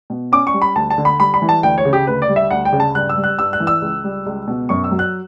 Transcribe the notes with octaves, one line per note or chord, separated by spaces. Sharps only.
B2
C#4 D6
C#6
G3
B5
D2 A5
A5
D3
B5
G3 B5
B5
E3
A5
D2 G5
C#5
C#3
G4
D2 B4
D5
G3
E5
D2 F#5
G5
C#3
A5
G2 F#6
E6
G3
F#6
G2 E6
F#6
E3
E6
C#2
G3
C#2
B2
F#2 C#6
E6
F#3
F#6